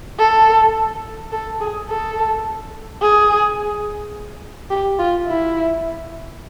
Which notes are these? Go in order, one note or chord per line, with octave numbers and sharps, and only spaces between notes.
A4
A4
G#4
A4
G#4
G4
F4
E4